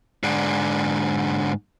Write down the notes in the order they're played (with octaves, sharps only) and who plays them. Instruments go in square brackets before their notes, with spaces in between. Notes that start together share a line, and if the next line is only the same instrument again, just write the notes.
[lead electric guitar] G#2 D3